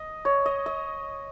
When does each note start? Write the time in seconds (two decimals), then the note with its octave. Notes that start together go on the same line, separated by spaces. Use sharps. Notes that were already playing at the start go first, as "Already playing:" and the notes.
Already playing: D#5
0.25 C#5
0.46 D#5
0.66 D#5